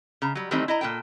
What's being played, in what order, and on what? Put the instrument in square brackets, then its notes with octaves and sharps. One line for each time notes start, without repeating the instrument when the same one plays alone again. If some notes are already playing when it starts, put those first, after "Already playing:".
[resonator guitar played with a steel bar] C#3 A#5
F#3 G3
D#3 E3 G3 A3 C4 D#4
E4 D#5 A#5
A#2 E3 A4 G5